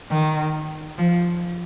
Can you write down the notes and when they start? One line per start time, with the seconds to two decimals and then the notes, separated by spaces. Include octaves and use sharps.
0.10 D#3
0.98 F3